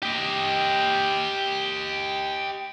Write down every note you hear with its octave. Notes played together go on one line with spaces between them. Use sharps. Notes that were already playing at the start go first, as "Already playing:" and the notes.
G4 D#5